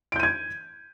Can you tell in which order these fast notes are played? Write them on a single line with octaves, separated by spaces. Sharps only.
D7 G6 D#7 G#6